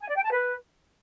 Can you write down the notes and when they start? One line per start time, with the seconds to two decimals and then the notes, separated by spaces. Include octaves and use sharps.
0.01 G#5
0.08 D5
0.16 G5
0.24 A5
0.31 B4